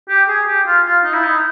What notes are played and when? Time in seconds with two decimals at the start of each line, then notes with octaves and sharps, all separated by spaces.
0.09 G4
0.28 G#4
0.47 G4
0.67 F4
0.86 F4
1.04 D#4
1.13 E4
1.24 D#4